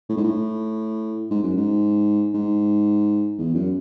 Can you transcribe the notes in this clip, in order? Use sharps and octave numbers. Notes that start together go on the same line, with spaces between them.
A2
G#2
A2
G#2
F#2
G#2
G#2
E2
F#2